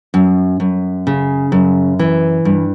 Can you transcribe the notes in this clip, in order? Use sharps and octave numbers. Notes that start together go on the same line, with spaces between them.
F#2
F#2
C#3
F#2
E3
G2